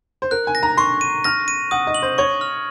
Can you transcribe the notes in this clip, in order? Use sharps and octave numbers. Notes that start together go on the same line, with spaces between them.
C5
A#4 F#6
G#5
A#6
A#5
C6 C#6
D#7
F6 A#6
D#7
F#5 D#6
D#5
F#7
C5
C#5 C#6
F6